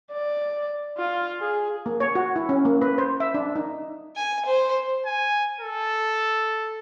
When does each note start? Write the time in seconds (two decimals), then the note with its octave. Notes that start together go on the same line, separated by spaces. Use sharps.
0.12 D5
0.97 F4
1.40 G#4
1.86 A#3
2.00 C#5
2.15 F#4
2.36 E4
2.49 C#4
2.65 A#3
2.82 B4
2.98 C5
3.20 E5
3.34 D4
3.55 D#4
4.16 G#5
4.45 C5
5.06 G#5
5.61 A4